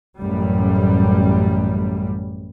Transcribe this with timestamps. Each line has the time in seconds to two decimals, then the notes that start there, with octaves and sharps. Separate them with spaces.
0.17 A1 F#2 G3